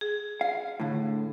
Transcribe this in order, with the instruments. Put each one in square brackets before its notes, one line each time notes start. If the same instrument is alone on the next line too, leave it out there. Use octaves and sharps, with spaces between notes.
[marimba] G#4
[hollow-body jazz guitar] F5
A2 D3